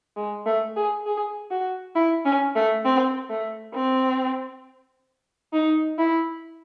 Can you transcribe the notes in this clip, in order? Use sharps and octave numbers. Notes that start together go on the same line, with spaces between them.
G#3
A3
G#4
G#4
F#4
E4
C#4
A3
C4
A3
C4
D#4
E4